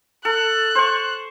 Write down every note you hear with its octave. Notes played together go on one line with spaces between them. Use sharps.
A4 F#6
C5 C#6